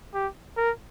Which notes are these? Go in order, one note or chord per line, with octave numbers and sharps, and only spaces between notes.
G4
A#4